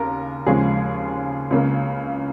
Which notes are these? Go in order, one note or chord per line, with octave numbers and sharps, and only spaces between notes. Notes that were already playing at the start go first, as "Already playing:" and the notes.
Already playing: D#2 C#3 A#4
D#2 C#3 F3 G#3 C#4 G#4
C#2 C#3 A#3